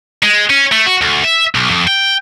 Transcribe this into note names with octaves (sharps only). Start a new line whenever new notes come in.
G#3
C#4
A3
F#4
D2
E5
B1
F2
G5